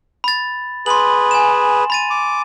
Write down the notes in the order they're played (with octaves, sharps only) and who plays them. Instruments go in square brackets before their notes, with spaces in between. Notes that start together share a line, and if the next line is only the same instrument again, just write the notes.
[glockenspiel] B5 A6
[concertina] G#4 B4 [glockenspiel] C6 F#7
[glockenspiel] G#5 E7
B5 A6 D#7
[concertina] D6